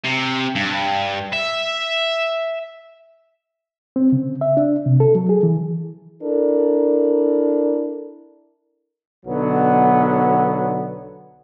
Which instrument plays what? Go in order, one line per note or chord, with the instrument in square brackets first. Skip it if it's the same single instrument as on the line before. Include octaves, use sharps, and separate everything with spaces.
[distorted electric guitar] C3
G2
E5
[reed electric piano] C4
C#3
E5
D4
C3
A4
F#3
G#4
E3
[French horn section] D4 E4 A4 A#4
[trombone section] B1 D3 F#3 B3